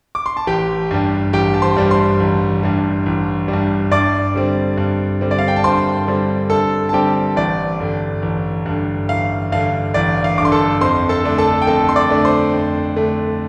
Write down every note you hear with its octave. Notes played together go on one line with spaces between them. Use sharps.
D6
C6
A5
A1 G4 G5
G2 G3
A1 G4 G5
A5
C5 C6
G2 G3
C5 C6
A1
G2 G3
A1
G3
G2
G2 D5 D6
D3 G3 C4
G2
D3 G3 C4
D5
F5
G5
A5
G2 C5 C6
D3 G3 C4
G2 A4 A5
A5
D3 G3 C4 G4 G5
A1 D5
G2 D3
A1
G2 D3
A1 F5
G2 D3 F5
A1 D5
F5
G2 D3 C6 D6
A4 A5
F2 C5 C6
A4 A5
D3 A3 D4
A4 A5
G5
F2 A4 A5
C6
D5 D6
D3 A3 D4
C5 C6
F2
D3 A3 D4